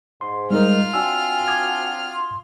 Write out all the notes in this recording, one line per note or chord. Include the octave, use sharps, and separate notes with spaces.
G#2 C6
G3 G#3 D#4 F4 A#4 F6
C4 D4 F#4 G#5 E6
D6 D#6 G#6
C6